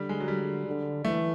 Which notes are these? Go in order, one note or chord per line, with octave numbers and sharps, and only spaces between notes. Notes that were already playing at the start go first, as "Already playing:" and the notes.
Already playing: D3 G3
G#3
F#3
G3
D3
E3 A3